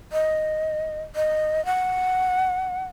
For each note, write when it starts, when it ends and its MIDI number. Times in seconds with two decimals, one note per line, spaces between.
0.12 1.03 75
1.16 1.64 75
1.65 2.85 78